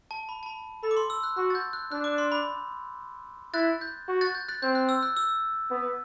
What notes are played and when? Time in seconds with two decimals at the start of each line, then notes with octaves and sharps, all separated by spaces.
0.11 A5
0.29 B5
0.43 A5
0.46 B5
0.83 A4 B5
0.91 D6
0.97 C6
1.10 E6
1.23 F#6
1.37 F#4 F#6
1.50 A6
1.55 G6
1.73 F#6
1.92 D4 F#6
2.04 D6
2.18 C6
2.32 B5
3.54 E4 F#6 A6
3.81 G6
4.08 F#4
4.21 F#6 A6
4.35 G6
4.48 F#6 A6
4.62 C4 G6
4.75 F#6
4.89 E6
5.03 F#6
5.17 E6
5.71 B3